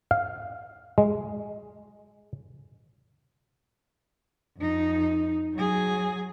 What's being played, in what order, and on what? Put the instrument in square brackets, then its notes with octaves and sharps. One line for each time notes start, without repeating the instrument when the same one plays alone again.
[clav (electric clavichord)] F5
G#3
[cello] F2 D#4
F#3 G#4